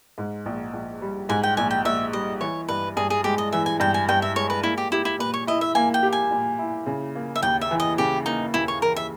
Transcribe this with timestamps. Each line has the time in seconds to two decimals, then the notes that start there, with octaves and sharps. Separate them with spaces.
0.18 G#2
0.46 A#1
0.73 A#1
1.02 G3
1.29 G#2 G#5
1.43 G5
1.57 A#1 G#5
1.71 G5
1.85 A#1 E5
2.13 G3 D#5
2.40 E3 C#5
2.68 G2 B4
2.96 G2 G#4
3.10 G#4
3.24 G#3 G4
3.38 D#5
3.52 E3 E5
3.66 G#5
3.80 G2 G5
3.94 G#5
4.08 G2 G5
4.22 E5
4.36 G#3 C#5
4.50 B4
4.63 A#3 E4
4.78 G4
4.92 E4 G4
5.05 E4
5.19 A#2 B4
5.34 C#5
5.47 E4 D#5
5.61 E5
5.75 A#3 G#5
5.94 G5
6.03 G4
6.13 G#5
6.31 A#2
6.58 E4
6.86 C#3
7.15 A#3
7.36 E5
7.43 D#2 G5
7.61 E5
7.71 E3
7.80 D#5
7.98 C#3 G4
8.26 A#3 D#4
8.54 D#2 E4
8.68 C#5
8.82 E3 A#4
8.96 E5